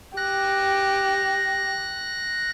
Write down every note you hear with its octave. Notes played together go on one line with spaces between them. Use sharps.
G4 F#6 A#6